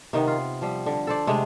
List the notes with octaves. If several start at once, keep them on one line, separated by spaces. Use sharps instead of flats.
C3 D#3 B3
F4
F3 G3
D3
A4 C5 D5
C3 G#3 A3 D4